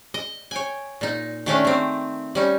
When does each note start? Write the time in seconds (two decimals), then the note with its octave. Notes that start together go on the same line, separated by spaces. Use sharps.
0.14 D#5
0.51 C#5 G5 G#5
1.01 A#2 D#4
1.46 D#3 A3 C#4 D4
1.65 D#3 C4
2.35 G3 C#4 D#4